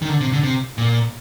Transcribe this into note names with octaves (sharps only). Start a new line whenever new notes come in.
D#3
D3
C3
D3
C3
A#2